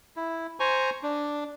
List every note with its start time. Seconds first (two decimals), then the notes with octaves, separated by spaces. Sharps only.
0.16 E4
0.60 C5 G#5 A#5 C#6
1.03 D4